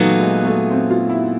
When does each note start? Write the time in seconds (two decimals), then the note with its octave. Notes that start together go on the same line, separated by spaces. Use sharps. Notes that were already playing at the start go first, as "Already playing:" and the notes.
Already playing: A#2 F#3 A3 B3 D#4
0.19 G#3
0.44 A3
0.70 C4
0.90 F4
1.09 E4